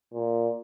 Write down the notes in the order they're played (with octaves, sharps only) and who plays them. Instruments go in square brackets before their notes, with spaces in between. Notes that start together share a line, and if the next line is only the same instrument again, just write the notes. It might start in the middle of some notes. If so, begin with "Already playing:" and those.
[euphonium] A#2